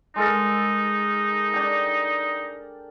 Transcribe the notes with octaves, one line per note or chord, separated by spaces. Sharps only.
G#3 D#4 A4 A#4
D4 G5